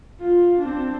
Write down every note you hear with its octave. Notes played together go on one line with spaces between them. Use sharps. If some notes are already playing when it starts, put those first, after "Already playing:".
F4
C4 D4